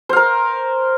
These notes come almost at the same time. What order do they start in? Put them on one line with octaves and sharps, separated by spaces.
C5 F5 A#4